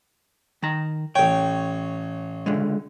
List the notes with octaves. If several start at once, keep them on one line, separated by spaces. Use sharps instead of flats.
D#3 A#5
A1 C#5 G5
C#2 D3 G#3